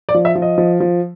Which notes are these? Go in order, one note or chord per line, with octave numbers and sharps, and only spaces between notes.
D5
F3
E5
F3
D#5
F3
F3